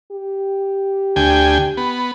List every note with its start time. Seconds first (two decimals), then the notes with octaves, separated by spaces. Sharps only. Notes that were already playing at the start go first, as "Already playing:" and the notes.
0.11 G4
1.16 D2 G5 G#5
1.77 B3